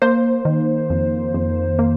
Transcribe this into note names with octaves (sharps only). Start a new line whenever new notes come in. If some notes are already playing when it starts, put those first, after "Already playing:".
A#3 C5
D#3
F2
F2
A#3